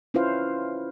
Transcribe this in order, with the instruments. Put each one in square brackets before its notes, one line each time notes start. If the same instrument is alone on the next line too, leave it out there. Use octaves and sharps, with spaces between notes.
[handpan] C#4 E4 F4 B4 C5 F5